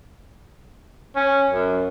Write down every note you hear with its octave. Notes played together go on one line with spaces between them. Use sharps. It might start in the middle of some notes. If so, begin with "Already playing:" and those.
C#4
F#2